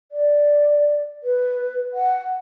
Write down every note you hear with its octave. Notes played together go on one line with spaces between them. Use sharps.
D5
B4
F#5